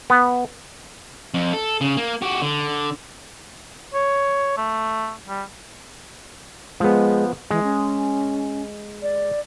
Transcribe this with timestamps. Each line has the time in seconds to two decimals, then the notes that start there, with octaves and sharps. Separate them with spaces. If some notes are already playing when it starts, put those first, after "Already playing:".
0.10 B3
1.34 F2
1.53 A4
1.81 C#3
1.97 A#3
2.22 F#4 G4
2.42 D3
3.94 C#5
4.58 A3
5.28 G3
6.80 F3 G#3 B3
7.51 E3 G#3
7.63 C#4
9.02 D5